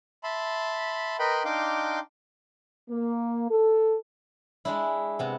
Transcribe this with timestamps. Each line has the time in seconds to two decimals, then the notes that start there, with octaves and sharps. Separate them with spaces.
0.23 E5 A5 B5 C6
1.19 A#4 B4 D#5 G5 B5 C6
1.45 D4 D#4 F5 G5 C6 D6
2.89 A#3
3.50 A4
4.65 G#3 D4 E4
5.19 C3 B3